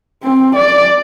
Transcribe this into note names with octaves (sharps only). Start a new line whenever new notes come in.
C4
D5